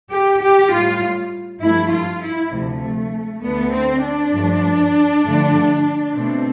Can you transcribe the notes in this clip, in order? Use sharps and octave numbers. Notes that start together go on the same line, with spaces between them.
G4
G4
A2 G3 F4
G2 F3 A3 E4
F4
E4
D2 C3 F3 A3
D2 D3 A3 B3
C4
D4
G2 F3 A3
G2 D3 F3 A3
B2 A3 C4